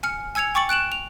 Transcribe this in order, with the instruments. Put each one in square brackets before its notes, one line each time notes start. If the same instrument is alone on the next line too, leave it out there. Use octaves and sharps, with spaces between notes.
[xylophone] G#5 F6 C#7
G#5 E6 G#6 C#7 F7
G5 C#6 D6 A6 C#7 F#7
F#6 D7 E7 F#7
F7